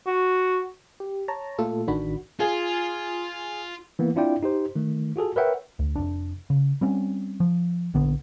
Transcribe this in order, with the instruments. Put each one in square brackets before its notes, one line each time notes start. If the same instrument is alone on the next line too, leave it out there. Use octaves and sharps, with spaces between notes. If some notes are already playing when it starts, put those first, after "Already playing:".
[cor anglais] F#4
[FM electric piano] G4
C#5 A5 A#5
A#2 A3 F4 A4
A1 D#3 D4 F#4 B5
[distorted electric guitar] F4 [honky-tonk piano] G#4
[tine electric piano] E3 A#3 B3
C4 D4 E4 F4 D5 G5
D#4 G4 C5
D#3 A3
F4 F#4 G#4 A4
A#4 B4 C#5 E5 F#5 G5
[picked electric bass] D2
F1 D4
C#3
G3 C4 C#4
F3
A#1 D3 B3